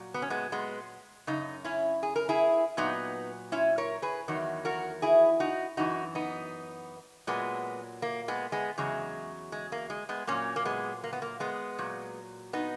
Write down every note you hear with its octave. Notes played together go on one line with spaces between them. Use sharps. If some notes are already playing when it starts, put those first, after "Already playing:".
Already playing: A#2 F#3
B3
C#4
G#3 B3
G#3 B3
F#2 C#3 D#4
C#4 E4
G#4
A#4
E4 G#4
A#2 F#3 B3 D#4
C#4 E4
A#4 C#5
G#4 B4
E2 D#3 F#3
F#4 A#4
E4 G#4
D#4 F#4
F#2 E3 D#4 F#4
B3 D#4
A#2 F#3 G#3 B3
A#3
G#3 B3
G#3 B3
E2 C#3 F#3 G#3
G#3
A#3
G#3
G#3 B3
A#2 F#3 A#3 C#4
A#3
G#3 B3
A#3
B3
A#3
G#3 B3
A#2 F#3
B3 D#4